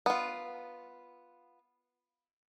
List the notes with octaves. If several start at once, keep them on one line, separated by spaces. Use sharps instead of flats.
B3 F4